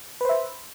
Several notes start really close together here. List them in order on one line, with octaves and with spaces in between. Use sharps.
B4 C5 E5